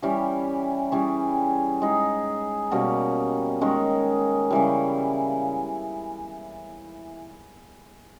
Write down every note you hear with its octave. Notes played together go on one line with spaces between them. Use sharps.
E3 G3 C#4 G4
E3 G3 C#4 G#4
G#3 D#4 G#4
B2 G3 A#3 C#4
D#3 G#3 C#4
C#3 E3 G3